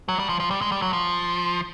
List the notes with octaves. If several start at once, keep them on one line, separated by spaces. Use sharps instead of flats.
F#3
G3
F3
F3
G3
G#3
G3
F#3
F3